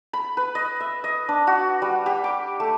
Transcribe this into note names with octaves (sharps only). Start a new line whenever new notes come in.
B5
B4
D#5
E5
D#5
D4
F#4
G3
G4
D6
A3